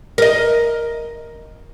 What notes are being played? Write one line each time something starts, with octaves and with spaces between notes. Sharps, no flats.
A#4 D#5